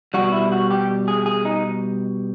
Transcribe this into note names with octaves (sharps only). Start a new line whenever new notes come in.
B2 G3 F#4
E4
F#4
G4
G#4
G#4
D#4